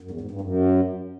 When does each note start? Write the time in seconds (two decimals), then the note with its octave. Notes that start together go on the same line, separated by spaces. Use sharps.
0.01 F#2
0.11 E2
0.21 G#2
0.31 G2
0.41 F#2